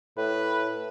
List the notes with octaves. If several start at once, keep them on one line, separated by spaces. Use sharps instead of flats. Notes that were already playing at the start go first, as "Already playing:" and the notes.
A2 B4